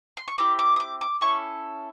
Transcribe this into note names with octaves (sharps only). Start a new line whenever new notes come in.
C6
C#6
C4 E4 G4 D6
D6
D#6
D6
D6
C#4 E4 A4 C#6